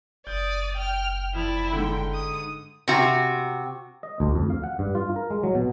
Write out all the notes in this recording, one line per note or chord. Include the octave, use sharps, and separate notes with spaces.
F#1 D5 D#6 G6
G5 F6
F2 E4 D5
G#2 D3 G5
D#6
C3 F#4
D#5
D2
F2
F5
F#5
G2
F4
A#4
G#3
F#3
B2